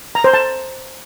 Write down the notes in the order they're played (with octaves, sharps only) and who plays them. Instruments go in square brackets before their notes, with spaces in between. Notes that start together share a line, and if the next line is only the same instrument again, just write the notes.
[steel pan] A#5
C5
A5